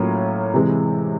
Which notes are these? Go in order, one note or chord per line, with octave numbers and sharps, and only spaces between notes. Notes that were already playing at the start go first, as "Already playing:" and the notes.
Already playing: A2 F#3 A#3 C#4 F4
C3 E3 G#3